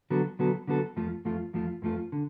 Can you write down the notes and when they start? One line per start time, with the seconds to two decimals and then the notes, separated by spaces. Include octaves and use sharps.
0.10 D3 F#3 B3 F#4 A4
0.39 D3 F#3 B3 F#4 A4
0.67 D3 F#3 B3 F#4 A4
0.96 F2 F3 A3 F4
1.25 F2 F3 A3 F4
1.53 F2 F3 A3 F4
1.82 F2 F3 A3 F4
2.12 D3